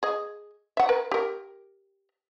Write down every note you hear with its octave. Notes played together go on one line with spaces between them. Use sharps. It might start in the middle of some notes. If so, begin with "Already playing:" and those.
G#4 D#5
E5 F#5
A#4 B4
G4 A#4